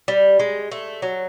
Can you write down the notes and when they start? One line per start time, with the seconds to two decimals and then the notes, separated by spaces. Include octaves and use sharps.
0.08 G3
0.39 G#3
0.72 A3
1.02 F#3